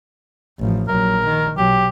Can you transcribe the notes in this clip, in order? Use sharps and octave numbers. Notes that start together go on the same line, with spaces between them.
A1 F3
A#1 F#3 A#4
D#3
B1 F#3 G4